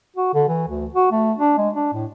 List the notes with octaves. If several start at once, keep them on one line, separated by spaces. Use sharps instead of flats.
F#4
D3
E3
D2
F#4
A3
D4
G#3
D4
A2